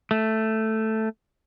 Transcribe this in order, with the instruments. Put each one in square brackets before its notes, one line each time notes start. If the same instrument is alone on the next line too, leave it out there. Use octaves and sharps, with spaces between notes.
[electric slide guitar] A3